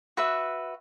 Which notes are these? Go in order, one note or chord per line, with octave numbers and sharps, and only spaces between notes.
F#4 B4 E5